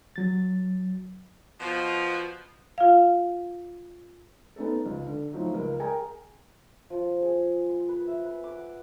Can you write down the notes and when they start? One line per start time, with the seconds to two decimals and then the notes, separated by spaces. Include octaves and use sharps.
0.16 F#3 A6
1.60 B2 F3
2.78 F4 F5
4.56 B3 C#4 D#4 A4
4.86 C#2
5.07 D3
5.33 A2 F3 F#3 D#4
5.54 C#2 A#4
5.80 G#4 A#4 G5 G#5 A#5
6.90 F3
7.23 G#4
7.70 C6
7.89 B4
8.07 E5
8.25 B4
8.44 D6
8.56 F#5